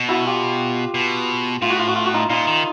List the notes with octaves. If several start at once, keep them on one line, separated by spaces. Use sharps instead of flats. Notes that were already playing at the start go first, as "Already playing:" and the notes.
Already playing: B2
E4 F#4
F4 G4
B2
A2 F4
F#4
F4
F#4
F4
F#4
D#4 F4
A#2 D#4 F4
D#3